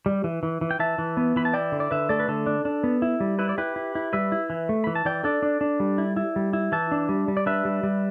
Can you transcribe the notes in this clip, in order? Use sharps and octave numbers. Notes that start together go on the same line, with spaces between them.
G3
E3
E3
E3
G5
E3 E5 A5
E3
B3
E3 B5
A5
E4 D5 G5
D3
D5
D3 B4 E5
A3 A4 D5
B4
D3 A4
D4
D4
B3
E4
G3
E4 B4
D5
E4 G4 B4
E4
E4
G3 B4 E5
E4
E3
A3
E3 B5
A5
E3 D5 G5
D4 A4 D5
D4
D4
G3
E4
E4
G3
E4
E3 E5 A5
D4
G3
G3
D5
D4 B4 E5
G3
G3